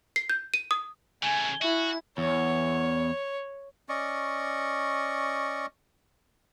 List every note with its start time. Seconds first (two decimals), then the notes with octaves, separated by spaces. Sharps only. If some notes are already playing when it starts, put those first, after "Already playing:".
0.16 C7
0.30 G6
0.54 D#7
0.71 D#6
1.23 C#3 A3 G#5
1.62 E4 F#4
2.18 E2 C#5
3.89 C#4 D5 D#5 C#6